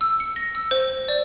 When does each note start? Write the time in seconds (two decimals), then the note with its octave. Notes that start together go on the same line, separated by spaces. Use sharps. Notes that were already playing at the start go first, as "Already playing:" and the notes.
0.01 E6
0.20 C#7
0.36 A#6
0.55 E6
0.71 C5
1.08 D5